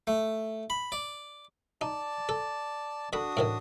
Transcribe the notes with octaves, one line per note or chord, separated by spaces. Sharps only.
A3
B5
D5
D#4 D5 A5
A4
D3 D4 F#4 B5 D#6
A2 D#3 E3